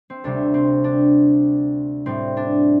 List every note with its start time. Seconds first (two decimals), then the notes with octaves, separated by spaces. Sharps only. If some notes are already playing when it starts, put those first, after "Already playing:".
0.10 C4
0.24 D2 C3 G3 D4
0.54 C4
0.84 D4
2.06 A2 G3 C4
2.37 D4